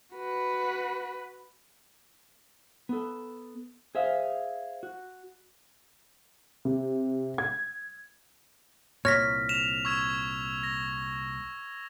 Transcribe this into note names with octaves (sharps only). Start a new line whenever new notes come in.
F#4 B4
B3 A4
G#4 C5 E5 F5
F#4
C3
G#6
C2 A#2 C#5 F6 A#6 B6
E7 F7
C#6 E6 G#6
A#6